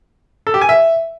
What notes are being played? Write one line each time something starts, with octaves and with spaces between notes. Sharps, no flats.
A4
G4
G#5
E5